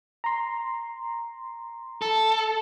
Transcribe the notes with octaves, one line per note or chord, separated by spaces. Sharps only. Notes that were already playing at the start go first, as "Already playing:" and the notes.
A#5 C6
A4